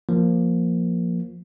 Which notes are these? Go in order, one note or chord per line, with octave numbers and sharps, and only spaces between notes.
F3 A#3